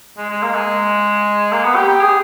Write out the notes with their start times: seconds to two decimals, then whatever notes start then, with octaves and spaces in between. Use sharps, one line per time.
0.17 G#3
0.30 G#3
0.43 A#3
0.54 G#3
1.52 A#3
1.64 B3
1.76 G4
1.88 G4
2.01 G#4